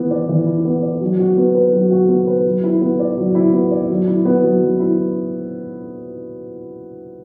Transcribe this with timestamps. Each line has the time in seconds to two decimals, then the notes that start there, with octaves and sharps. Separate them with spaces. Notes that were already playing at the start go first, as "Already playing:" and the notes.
Already playing: E3 B3 E4
0.11 D5
0.29 E3
0.47 E4
0.65 B3
0.83 D5
1.01 F#3
1.19 F#4
1.37 B3
1.55 B4
1.73 F#3
1.91 F#4
2.09 B3
2.27 B4
2.45 F#3
2.64 E4
2.81 B3
3.00 D5
3.17 F#3
3.35 E4
3.53 B3
3.71 D5
3.89 F#3
4.08 E4
4.25 B3
4.44 F#3
4.61 F#3
4.80 E4